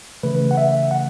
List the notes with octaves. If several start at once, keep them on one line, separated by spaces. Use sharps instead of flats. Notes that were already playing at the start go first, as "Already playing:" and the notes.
C#3 E3 A3 B4
F#5
E5
F#5